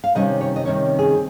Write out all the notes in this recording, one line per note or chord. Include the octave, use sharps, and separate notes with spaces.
F5
C3 D#3 G3 C#4 D#5
C#5
D#5
C3 D#3 G3 C#4 C#5
G#4
C4